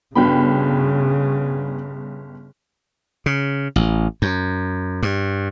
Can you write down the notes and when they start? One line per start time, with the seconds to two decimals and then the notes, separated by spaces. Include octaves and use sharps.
0.15 G1 C#3 B3 D4 F#4 G5 B5
3.26 C#3
3.76 A1
4.22 F#2
5.03 G2